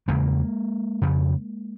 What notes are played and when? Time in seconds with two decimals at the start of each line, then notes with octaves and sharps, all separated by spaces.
0.08 E2 C#3 G#3 A#3
1.02 F2 C#3